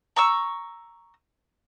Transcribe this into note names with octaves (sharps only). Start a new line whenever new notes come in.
A#5 C#6 E6